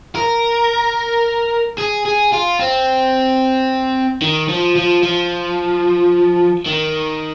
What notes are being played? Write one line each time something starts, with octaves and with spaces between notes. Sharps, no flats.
A#4
G#4
G#4
F4
C4
D#3
F3
F3
F3
D#3